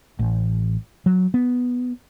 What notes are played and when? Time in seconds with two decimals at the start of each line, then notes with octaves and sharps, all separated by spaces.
0.19 A1
1.06 F#3
1.34 B3